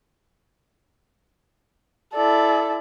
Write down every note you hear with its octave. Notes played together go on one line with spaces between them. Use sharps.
E4 A4 D5